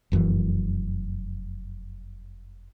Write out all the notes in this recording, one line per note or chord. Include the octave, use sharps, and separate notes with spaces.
F1 F#2 B2 E3